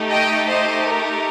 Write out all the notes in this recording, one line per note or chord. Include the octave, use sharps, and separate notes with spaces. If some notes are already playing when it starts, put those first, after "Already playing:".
Already playing: A3 D#4 G4
D#5 G5
C5 D#5
A#4